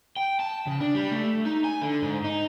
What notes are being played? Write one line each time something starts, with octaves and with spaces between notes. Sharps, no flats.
G5
A5
C#3
D4
G3
A3
D#4
G#5
D3
G#2
D#4